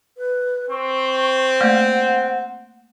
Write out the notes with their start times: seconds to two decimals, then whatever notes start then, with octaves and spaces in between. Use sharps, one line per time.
0.17 B4
0.70 C4 C#6
1.61 A3 A#3 D5 F#5